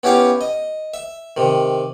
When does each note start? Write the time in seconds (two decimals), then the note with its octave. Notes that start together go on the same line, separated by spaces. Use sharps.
0.03 B3 C#4 E4 G4 F5
0.41 D#5
0.94 E5
1.37 C3 D#3